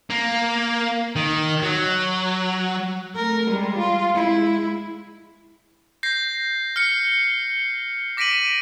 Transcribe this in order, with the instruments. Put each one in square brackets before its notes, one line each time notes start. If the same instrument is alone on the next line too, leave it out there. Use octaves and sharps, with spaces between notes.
[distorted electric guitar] A#3
D#3
F#3
[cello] A3 A#4
G3 G#3
F4
G#3 E4
[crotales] G6 A#6 C7
F6 C7 C#7
D6 A#6 B6 D7 D#7 F#7